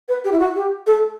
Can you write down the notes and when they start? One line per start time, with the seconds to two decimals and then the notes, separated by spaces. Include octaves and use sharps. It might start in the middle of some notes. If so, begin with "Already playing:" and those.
0.09 B4
0.24 G4
0.32 E4
0.40 F#4
0.55 G4
0.87 A4